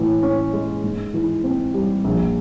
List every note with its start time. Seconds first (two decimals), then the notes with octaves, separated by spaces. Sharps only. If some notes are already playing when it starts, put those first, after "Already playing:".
Already playing: A2 E3
0.23 C#4
0.53 G#3
0.84 G#2
1.14 E3
1.44 C4
1.74 G3
2.04 A#1